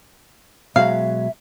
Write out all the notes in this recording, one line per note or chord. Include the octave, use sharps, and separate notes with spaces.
B2 F#3 G#3 E5 F5